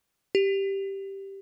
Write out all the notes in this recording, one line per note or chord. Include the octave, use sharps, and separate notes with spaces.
G4